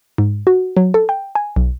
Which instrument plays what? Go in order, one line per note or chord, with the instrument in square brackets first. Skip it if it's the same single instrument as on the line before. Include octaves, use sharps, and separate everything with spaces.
[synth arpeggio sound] G#2
F#4
F#3
A4
G5
G#5
B1